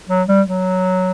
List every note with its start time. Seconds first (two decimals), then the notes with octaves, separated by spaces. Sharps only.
0.09 F#3
0.28 G3
0.47 F#3